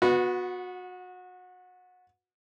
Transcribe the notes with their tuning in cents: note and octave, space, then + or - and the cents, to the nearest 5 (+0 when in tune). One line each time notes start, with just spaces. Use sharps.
B3 +0 F#4 -25